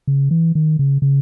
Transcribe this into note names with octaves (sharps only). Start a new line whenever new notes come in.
C#3
E3
D#3
C#3
C#3